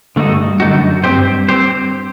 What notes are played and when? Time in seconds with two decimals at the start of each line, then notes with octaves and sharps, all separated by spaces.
0.16 G2 D3 A3 D#4 F#4
0.60 F#2 D3 A3 D#4 F#4
1.04 G2 C4 G4 C5
1.49 C4 G4 C5